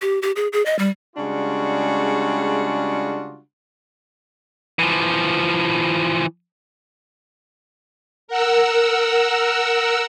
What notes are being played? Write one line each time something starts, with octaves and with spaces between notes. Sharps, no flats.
G4
G4
G#4
G#4
D#5
G3
C#3 G3 G#3 D4 F4 F#4
E3 F3
A#4 F#5 E6